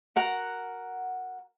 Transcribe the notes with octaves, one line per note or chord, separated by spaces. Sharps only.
F#4 A#4 F#5